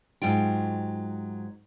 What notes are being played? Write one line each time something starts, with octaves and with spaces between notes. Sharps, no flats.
G#2 F#3 F4 G5